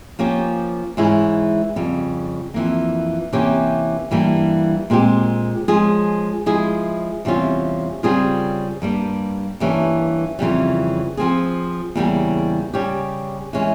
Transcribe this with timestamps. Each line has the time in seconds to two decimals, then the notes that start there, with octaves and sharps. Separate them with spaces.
0.19 F3 A#3 C#4 G4
0.97 G#2 E3 G#3 C#4 E4
1.76 F2 C#3 G3
2.54 F2 E3 A#3
3.33 C3 E3 A#3 C#4 G4
4.11 G2 E3 G3 A#3
4.90 A#2 G#3 C4 G4
5.68 F3 G#3 C#4 F4 G#4
6.46 F3 G#3 E4 G#4
7.25 E2 C3 G3 C#4 F4
8.03 C#3 G3 C4 F4 G#4
8.82 G2 G3 A#3
9.60 G2 E3 G3 A#3 C#4
10.39 F2 C#3 E3 G3
11.17 F3 C4 F4 G#4
11.95 E2 C#3 G3 A#3 C#4
12.74 C#3 G3 C#4 G4
13.53 E3 G#3 C#4